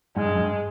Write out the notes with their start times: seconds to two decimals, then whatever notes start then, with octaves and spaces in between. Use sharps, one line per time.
0.17 G#2 G#3
0.26 G2
0.35 F#2
0.44 G2